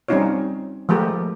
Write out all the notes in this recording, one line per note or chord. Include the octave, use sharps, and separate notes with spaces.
G3 C4 C#4 D#4 F4 C#5
F3 G#3 A3 G4 A#4